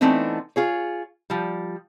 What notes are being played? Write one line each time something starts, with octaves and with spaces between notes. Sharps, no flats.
E3 A3 B3 C4 D4 D#4
F4 G#4 C#5
F3 G3